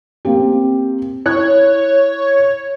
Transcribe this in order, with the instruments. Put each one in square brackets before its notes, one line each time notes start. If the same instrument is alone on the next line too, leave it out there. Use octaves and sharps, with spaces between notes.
[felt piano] A#3 C4 G4
[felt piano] E4 F#6 [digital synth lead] C#5